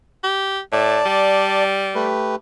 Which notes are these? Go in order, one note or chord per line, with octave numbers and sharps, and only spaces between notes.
G4
A2 D5 A5
G3
A3 G4 B4